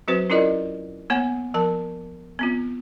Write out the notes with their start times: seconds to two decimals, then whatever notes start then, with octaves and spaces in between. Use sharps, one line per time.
0.08 F#3 C4 F#4 B4 C5
0.30 C#4 E4 F4 A#4 D5 D#5
1.10 A#3 B3 C#5 F#5 G#5
1.54 F3 A#4 A5
2.39 B3 C4 F4